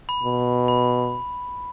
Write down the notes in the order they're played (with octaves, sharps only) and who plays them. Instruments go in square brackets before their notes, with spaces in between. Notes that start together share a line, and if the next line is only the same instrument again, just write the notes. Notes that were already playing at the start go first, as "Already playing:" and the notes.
[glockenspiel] B5
[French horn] B2
[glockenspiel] B5